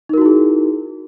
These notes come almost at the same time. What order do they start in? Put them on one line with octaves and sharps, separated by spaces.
D#4 A#4 F#4 E4 G#4